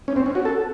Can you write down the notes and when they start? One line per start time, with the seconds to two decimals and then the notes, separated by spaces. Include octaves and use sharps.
0.08 C#4
0.16 C4
0.26 C#4
0.35 F#4
0.45 A4